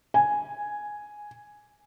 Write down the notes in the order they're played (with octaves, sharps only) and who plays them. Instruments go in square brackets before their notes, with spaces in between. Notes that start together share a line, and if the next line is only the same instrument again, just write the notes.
[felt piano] G#5